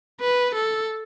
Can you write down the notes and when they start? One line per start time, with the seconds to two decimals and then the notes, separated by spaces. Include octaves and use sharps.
0.21 B4
0.55 A4